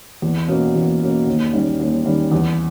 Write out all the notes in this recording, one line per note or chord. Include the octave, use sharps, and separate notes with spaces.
E2
B2 A#3 C#4
E2
B2 A#3 C#4
D#2
D#3 G3 C#4
D#2
D#3 G3 C#4
E2